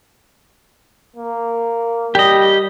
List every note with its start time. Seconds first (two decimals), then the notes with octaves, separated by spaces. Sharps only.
1.16 A#3
2.15 G3 G4 D#5